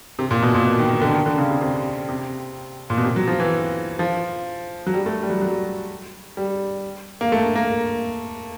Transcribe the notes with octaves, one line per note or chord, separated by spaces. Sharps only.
C3
A#2
B2
A#2
B2
D#3
D#3
D3
D#3
D3
C#3
C3
C3
C3
A#2
B2
C3
F#3
F3
E3
F3
F#3
G3
A3
G3
F#3
F#3
G3
A#3
A3
A#3